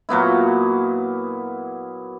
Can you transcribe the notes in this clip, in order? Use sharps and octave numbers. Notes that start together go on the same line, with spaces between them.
A#2 F#3 B3 E4